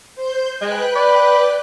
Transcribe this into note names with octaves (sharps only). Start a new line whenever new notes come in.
C5 G6
G#3 B4 G5 F#6
D5 B5